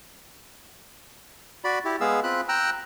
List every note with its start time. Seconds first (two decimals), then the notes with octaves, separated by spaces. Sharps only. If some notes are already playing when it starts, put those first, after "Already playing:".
1.64 F#4 D5 B5
1.85 E4 G4
2.01 G#3 B3 G#4 F5 E6
2.23 C4 F4 B5 F#6
2.49 G5 A#5 E6 F#6